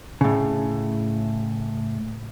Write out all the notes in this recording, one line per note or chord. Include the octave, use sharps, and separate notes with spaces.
A2 C#3